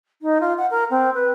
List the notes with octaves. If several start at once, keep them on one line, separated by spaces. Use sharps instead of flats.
D#4
F4
F#5
A#4
C4
B4